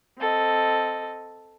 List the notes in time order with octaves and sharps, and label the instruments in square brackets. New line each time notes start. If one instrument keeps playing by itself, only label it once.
[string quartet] C4 A4 D#5